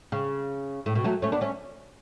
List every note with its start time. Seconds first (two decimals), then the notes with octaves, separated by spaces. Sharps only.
0.12 C#3
0.86 A2
0.95 B2
1.04 F#3 A3
1.22 A3 C#4
1.32 B3 D4
1.41 A3 C#4